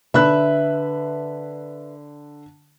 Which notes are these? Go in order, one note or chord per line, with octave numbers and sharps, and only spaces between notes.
D3 B4 E5 B5 F#6